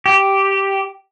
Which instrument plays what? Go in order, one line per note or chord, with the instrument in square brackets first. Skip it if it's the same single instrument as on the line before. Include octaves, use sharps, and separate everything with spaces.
[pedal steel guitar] G4